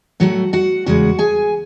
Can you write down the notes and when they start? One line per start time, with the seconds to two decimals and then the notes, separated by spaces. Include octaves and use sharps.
0.20 A2 F#3 A3 F#4 F#5
0.53 F#4 F#5
0.86 E2 C#3 G#3 F#4 F#5
1.19 G#4 G#5